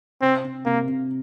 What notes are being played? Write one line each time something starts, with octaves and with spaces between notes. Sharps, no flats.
C3 C4
C3
C3 A#3
C3